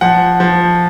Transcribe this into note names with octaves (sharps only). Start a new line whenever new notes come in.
F3 F#5
F3